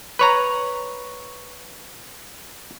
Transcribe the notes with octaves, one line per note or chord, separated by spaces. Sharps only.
B4 C#5 A#5